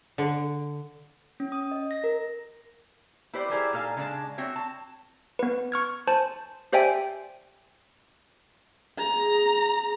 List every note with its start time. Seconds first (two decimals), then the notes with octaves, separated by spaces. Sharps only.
0.18 D3
1.40 C#4
1.52 D#6
1.71 D#5
1.91 A#6
2.04 A#4
3.33 E4 G4 B4 C5 D5
3.49 E4 G4 G#4 A#4 C5 D5
3.73 A#2 D#4 A4 F5 G#5
3.97 C#3 G#3 D4 A4 A5
4.38 C4 F#4 C#5 E5
4.56 A5
5.39 B3 B4
5.72 C#6 F6 G#6
6.07 C5 G#5 A5
6.73 G4 C5 D5 E5 G5 G#5
8.99 G#4 A#5